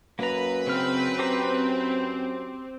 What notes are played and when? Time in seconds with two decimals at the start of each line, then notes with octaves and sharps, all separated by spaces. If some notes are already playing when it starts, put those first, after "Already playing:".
0.19 F#2 A#3 B4 A#5
0.67 C#3 C4 F6
1.19 G4 C5 A#5